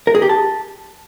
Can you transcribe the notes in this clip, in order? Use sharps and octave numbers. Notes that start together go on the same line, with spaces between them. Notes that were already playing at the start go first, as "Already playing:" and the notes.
A#4
G#4
G4
A5